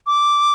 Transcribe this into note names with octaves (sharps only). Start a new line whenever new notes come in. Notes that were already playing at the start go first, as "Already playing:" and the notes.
D6